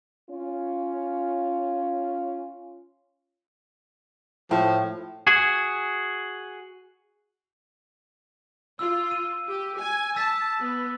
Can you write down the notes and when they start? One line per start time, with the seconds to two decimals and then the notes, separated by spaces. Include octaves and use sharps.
0.30 C#4 F4
4.51 A2 F3
5.27 F#4 G#4 G#5
8.79 F4 E6
9.11 D#7
9.47 G4
9.78 G#5
10.16 A5 E6 A6 B6
10.60 B3